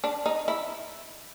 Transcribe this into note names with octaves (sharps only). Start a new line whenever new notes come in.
D4
D#4
E4